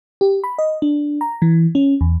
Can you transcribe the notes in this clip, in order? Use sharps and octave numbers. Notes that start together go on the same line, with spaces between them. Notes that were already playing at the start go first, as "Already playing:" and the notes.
G4
B5
D#5
D4
A#5
E3
C#4
E2